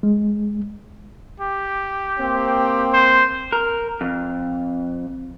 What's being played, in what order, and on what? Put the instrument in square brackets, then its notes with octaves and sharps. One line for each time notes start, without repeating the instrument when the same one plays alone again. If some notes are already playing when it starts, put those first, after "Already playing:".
[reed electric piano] G#3
[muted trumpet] G4
[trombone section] A#3 C4
[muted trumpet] C5
[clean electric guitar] A#4
F2